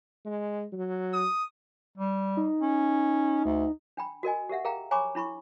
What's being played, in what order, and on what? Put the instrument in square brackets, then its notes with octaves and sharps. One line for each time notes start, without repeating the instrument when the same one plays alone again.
[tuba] G#3
F#3
[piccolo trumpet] D#6
[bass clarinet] G3
[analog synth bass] D#4
[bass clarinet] C#4
D2
[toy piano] D4 G5 B5
F#4 A#4 D#5 G#5
G4 A#4 E5 F#5
G#4 A#4 F5 G5 A#5
C#5 G#5 A#5 B5 C#6 D6
D4 E4 B5 C#6